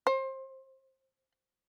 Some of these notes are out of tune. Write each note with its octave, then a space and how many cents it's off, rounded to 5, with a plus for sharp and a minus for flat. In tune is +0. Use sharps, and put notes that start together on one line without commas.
C5 +25